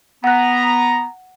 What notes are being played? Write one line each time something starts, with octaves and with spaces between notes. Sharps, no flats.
B3 F#5 A#5 F#6